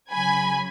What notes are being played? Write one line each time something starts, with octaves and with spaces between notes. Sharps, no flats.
C#3 F#3 G#5 B5